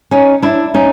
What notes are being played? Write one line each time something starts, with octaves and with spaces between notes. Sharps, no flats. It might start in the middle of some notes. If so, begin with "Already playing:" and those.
C#4 D#4
D4 E4
C#4 D#4